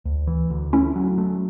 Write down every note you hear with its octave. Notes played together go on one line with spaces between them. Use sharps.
D2
E3
D2
A3 C#4 E4
F#3
A3